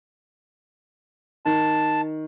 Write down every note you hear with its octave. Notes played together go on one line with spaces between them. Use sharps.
D#3 A5